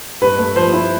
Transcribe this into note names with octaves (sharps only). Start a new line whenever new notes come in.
G2 B4
A3
F3 C5
E4